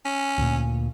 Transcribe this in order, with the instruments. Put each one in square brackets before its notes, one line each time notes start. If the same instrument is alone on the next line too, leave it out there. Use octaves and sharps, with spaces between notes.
[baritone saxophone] C#4
[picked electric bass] D2 A#2